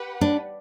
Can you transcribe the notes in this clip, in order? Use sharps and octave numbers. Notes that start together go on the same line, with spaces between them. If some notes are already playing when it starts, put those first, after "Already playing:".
Already playing: G4 B4 F#5
D4